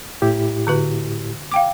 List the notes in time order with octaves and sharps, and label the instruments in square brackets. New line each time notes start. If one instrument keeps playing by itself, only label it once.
[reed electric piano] A2 E4 G4
[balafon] D3 F#4 B4
F5 G5 D6